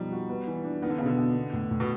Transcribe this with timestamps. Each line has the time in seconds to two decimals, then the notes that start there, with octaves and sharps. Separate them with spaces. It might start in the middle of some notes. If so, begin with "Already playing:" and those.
Already playing: B2 F3 G3 D#4
0.12 F#4
0.29 B3
0.47 E3
0.65 D4
0.82 D#3 B3
0.90 D3
0.98 C#3
1.01 B2 D3
1.19 B2
1.35 B3
1.53 A2
1.71 A2
1.80 B2